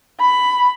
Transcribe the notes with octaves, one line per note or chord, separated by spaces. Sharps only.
B5